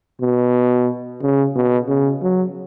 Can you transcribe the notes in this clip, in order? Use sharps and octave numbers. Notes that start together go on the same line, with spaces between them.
B2
C#3
B2
C#3
F#3